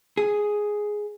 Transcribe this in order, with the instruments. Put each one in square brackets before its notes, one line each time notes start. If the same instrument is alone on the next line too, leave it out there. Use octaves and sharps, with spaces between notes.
[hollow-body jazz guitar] G#4